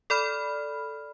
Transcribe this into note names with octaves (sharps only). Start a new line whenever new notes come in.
A4 D5 B5 F6